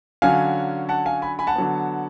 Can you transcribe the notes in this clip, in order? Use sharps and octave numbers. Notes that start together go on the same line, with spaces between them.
D3 F#3 C#4 F5 G#5
F#5 A5
F5 G#5
G#5 B5
G#5 B5
F#5 A5
D3 F#3 B3